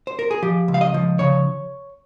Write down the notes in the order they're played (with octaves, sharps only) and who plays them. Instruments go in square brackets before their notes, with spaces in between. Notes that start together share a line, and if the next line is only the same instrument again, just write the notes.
[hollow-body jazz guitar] C5
A#4
G#4
F3 G4
C#2
F5
D#5
F3
C#3 C#5